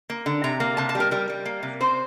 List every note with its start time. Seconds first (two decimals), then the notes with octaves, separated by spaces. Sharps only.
0.10 A#3
0.26 D3
0.44 C3 A#5
0.60 A#3
0.77 C3 A5
0.89 A5
0.95 G3
1.00 A#4
1.11 G3 A#4
1.30 G3
1.46 A#3
1.63 C3
1.81 C4 C5